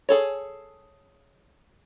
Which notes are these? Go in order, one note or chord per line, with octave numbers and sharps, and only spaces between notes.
G#4 A4 C#5